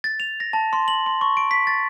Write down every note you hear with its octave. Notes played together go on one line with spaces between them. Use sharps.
A6
F7
A#6
A5
C6
F#7
C6
C#6
D7
B6
A6